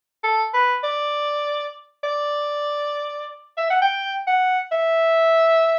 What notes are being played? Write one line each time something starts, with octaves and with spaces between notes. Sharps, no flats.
A4
B4
D5
D5
E5
F#5
G5
F#5
E5